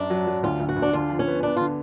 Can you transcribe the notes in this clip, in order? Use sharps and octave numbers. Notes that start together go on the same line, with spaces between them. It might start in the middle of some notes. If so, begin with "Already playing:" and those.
Already playing: F#2 D4
F#3
F#3
D2 F4
D2
F#4
D2
D4
D3 F4
F3
C#4
B3
B3 D4
F4
D3